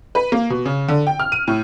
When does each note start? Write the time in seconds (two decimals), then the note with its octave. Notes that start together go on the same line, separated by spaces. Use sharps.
0.15 B4
0.32 A#3
0.50 B2
0.66 C#3
0.88 D3
1.07 G5
1.20 F6
1.32 D#7
1.48 A2